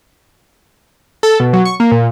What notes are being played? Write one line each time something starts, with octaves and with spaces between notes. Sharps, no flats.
A4
B2
F#3
C#6
A#3
A#2